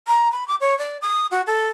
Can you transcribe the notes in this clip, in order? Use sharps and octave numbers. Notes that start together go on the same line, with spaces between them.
A#5
B5
D6
C#5
D5
D#6
F#4
A4